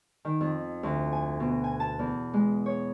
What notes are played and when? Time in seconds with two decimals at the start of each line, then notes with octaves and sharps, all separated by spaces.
0.25 D#3
0.40 F2
0.83 D2
1.12 G#5
1.40 B2
1.64 G#5
1.80 A5
1.99 E2
2.33 G#3
2.66 C#5